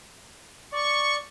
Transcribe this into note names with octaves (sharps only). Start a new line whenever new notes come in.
D5 C#6